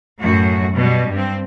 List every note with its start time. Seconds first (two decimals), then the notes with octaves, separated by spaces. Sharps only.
0.22 F#2 A2 F#4
0.75 B2 G3
1.11 G2 C4